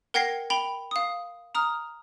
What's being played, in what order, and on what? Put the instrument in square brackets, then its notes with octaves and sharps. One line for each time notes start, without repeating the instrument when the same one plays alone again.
[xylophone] A#4 F#5 G5 G#6 A#6 C7
G5 B5 F7 G7
F5 D#6
A#5 D#6 F6